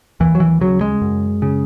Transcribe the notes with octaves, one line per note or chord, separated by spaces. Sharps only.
D#2 E3
F#3
E3
C#3 F#3
G#3
F#2
C#3